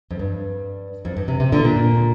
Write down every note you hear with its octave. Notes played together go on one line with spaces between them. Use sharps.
F2
G2
F2
G2
C3
C3
A#2 D3
A#2